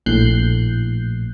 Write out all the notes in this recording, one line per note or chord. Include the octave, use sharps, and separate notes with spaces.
A#1 A2 F#6 G6 C7